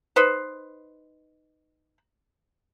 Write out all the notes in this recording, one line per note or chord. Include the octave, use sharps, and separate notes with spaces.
D#4 B4 C5